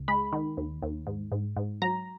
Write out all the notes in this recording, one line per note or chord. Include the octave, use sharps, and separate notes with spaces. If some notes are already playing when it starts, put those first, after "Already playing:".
Already playing: C#2
G#3 B5
D#3
D#2
D#2
G#2
G#2
G#2
F#3 A#5